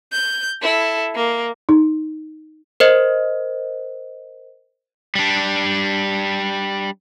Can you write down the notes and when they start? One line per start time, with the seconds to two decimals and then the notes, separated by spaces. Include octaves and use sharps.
0.12 G6
0.62 E4 A4
1.15 A#3
1.69 D#4
2.80 A#4 C5 D#5
5.15 G3 D4